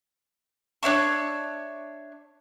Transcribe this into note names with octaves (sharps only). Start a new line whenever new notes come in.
D4 C#5 E5 C#6